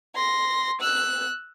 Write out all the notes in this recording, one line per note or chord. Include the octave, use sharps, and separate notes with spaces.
C6 A#6
E6 F#6